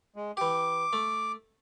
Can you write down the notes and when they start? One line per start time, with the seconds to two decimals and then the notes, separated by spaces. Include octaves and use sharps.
0.16 G#3
0.37 E3 G4 D6
0.93 A3